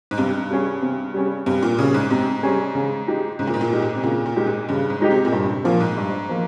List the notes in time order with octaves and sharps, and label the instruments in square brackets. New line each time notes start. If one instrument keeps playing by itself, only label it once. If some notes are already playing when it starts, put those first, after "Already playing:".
[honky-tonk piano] G#2
[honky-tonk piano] G2 [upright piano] C3
[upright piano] G3 C#4 G#4
C3
G3 C#4 G#4
[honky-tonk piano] G2 [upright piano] C3
[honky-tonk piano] A#2
[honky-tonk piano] C#3 [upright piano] G3 C#4 G#4
[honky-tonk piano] G#2
[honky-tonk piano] G#2 [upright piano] C3
[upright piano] G3 C#4 G#4
C#3
G#3 D#4 G4
[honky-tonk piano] G#2 [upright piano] C#3
[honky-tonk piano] A#2
G#2
A#2
[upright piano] G#3 D#4 G4
[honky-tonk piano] G#2
C3
[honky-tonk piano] A#2 [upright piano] C#3
[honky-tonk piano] A#2
[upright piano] G#3 D#4 G4
[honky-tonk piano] G#2
[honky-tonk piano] G2 [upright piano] C#3
[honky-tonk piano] G#2
[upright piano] G#3 D#4 G4
[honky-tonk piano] C3
A#2
[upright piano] G2 [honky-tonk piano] C3
[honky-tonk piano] C3
[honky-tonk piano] A#2 [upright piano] F3 A#3
[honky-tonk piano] G#2
[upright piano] G2
F3 A#3